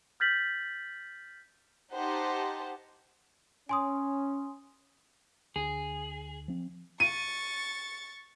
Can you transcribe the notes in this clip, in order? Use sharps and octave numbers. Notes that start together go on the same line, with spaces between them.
F6 G6 A6 B6 F#7
D#4 G4 C5 F#5 A5
C#4 G#5 C6 D#6
D2 G#4
F3 C4
C#6 A6 D#7